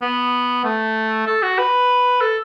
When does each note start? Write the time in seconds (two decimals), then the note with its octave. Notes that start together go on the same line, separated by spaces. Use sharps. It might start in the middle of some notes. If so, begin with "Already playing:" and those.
0.02 B3
0.64 A3
1.27 A4
1.42 F#4
1.58 B4
2.21 A4